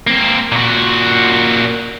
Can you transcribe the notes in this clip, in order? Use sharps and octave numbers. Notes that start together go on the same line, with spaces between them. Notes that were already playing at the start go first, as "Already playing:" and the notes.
A#3 C4
A#2 F#4